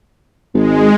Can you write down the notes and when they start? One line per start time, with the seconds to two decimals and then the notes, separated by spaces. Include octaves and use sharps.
0.55 G#1 G#3